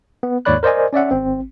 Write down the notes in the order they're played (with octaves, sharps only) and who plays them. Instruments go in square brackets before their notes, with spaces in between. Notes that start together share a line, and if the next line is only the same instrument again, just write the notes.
[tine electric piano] B3
D#2 G#2 C#5 D5 B5 F#6
A#4 C5 D5 D#5 G#5
C#4 D5 E5 F#5
G#1 C4